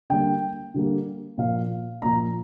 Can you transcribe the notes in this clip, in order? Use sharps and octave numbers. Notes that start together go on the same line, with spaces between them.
D3 G3 A#3 G5
D3 G3 A#3
A#2 F3 A#3 F5
A#2 F3 A#3 A#5